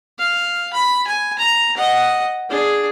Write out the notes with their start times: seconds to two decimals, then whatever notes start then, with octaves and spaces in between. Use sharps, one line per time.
0.19 F5
0.73 B5
1.07 G#5
1.39 A#5
1.77 D#5 F#5
2.50 D4 G#4